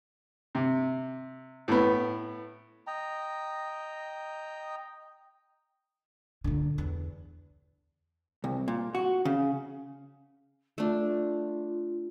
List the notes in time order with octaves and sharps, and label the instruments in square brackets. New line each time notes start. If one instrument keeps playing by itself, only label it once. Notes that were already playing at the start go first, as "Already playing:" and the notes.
[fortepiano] C3
A2 B3
[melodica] D#5 G5 A#5
[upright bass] A#2 D3
E2
[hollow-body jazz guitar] C2
A#2
F#4
C#3
[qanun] A3 D4 [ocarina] F4